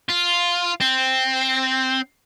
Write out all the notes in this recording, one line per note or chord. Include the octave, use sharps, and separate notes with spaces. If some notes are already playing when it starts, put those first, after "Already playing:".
F4
C4